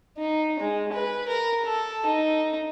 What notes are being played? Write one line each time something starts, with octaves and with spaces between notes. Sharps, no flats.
D#4
G#3
B4
A#4
A4
D#4